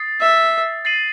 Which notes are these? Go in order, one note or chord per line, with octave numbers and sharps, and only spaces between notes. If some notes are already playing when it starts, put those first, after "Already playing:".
Already playing: D#6 A6 C7
E5
A6 C7 D#7 F#7